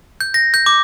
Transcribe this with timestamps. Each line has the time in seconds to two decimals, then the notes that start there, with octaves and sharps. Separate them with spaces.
0.20 G6
0.34 A#6
0.54 G6
0.66 D6